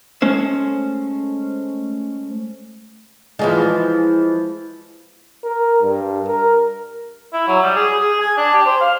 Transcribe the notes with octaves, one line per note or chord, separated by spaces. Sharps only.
G#3 A3 C#4 C5
E3 F3 G#3
A#4
G2
A#4
E4
F#3
G3
G#4
G#4
G#5
D4
G4
C5
F5